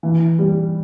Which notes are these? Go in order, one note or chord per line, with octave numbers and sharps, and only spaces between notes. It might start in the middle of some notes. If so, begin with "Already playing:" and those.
E3
G3